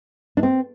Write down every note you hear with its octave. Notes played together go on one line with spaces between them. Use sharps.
D4
C4